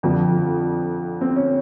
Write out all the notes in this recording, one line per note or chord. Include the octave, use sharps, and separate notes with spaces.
F2 D3 F3 D4
C4
C#4